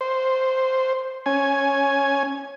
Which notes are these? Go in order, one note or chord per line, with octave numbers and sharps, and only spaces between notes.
C5
C#4 G#5